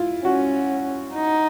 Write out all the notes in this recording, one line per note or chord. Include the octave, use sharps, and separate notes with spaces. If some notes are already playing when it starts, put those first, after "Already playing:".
Already playing: E4 F4
C#4 F#4
D#4